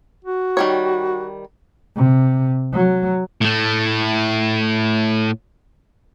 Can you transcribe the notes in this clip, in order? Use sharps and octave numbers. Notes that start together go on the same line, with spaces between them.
F#4
D#3 G3 C#5
C3
F#3
A2 A3